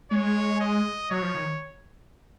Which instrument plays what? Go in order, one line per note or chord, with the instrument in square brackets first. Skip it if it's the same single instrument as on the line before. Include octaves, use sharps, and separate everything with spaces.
[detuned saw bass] G#3 [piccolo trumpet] C#5
[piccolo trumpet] D#5
[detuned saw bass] F#3 [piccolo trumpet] C#5
[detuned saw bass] F3
D#3